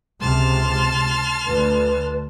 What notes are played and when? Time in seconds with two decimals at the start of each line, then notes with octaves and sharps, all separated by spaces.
0.20 C#2 C3 A5 C6 F6
1.47 D2 B4